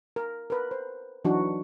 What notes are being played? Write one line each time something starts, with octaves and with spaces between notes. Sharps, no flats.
A#4
A#4 B4
C5
E3 F#3 D4 D#4 F#4